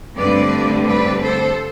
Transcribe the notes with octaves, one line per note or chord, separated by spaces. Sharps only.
G2 D3 A3 C4 B4 D5
B4 D5
A4 C5